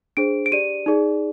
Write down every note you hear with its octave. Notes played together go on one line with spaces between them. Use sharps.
D4 G#4 C5 D7
D7
G4 D5 D#7
D#4 G#4 D5